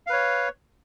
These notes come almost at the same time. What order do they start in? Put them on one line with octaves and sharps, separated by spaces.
F5 B4 C#5